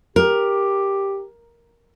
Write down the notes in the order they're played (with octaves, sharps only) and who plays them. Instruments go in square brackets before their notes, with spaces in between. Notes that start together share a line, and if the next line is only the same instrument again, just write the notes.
[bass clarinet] G4 [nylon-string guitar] A#4